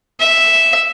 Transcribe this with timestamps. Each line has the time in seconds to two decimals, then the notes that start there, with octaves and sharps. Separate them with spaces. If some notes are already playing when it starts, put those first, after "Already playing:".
0.21 E5